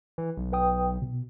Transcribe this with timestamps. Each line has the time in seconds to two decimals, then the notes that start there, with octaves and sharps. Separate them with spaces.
0.18 E3
0.37 B1
0.53 B4 G5 D#6
1.02 B2